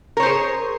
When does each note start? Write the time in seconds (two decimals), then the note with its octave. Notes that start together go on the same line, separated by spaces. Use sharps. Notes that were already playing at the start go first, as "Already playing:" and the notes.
0.17 A#4
0.20 C#5
0.23 C5
0.26 G#4